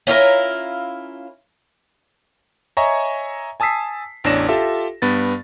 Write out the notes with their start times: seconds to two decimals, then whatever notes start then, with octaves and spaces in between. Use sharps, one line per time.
0.07 C#4 E4 F4 A#4
2.77 C#5 D#5 E5 G#5 A#5 C#6
3.60 G#5 A5 D#6 E6 B6 C7
4.24 A1 E2 D4 C#5 A#6 E7
4.48 F4 G4 A4 E5
5.02 G2 B3 A6